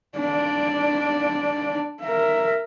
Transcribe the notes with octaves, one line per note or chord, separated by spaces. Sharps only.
D4 D5
A#4 E5